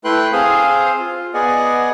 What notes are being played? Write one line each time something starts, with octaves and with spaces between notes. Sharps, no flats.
A3 E4 B4 G5 C6 F#6
C4 G#4 C5 F5 D#6
F4
B3 G#4 D5 D#5 F#5 G#5